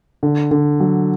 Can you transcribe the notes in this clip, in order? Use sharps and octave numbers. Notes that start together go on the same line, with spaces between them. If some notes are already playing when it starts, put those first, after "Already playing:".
D3
D3
F#3